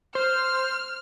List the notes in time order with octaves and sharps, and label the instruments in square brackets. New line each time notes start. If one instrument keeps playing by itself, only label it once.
[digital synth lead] C5 [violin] F6